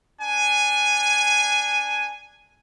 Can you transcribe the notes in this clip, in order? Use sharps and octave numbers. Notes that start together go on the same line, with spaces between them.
D4 G#5